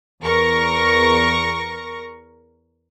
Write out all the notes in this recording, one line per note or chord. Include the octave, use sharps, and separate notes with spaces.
E2 A#4 C#6 A#6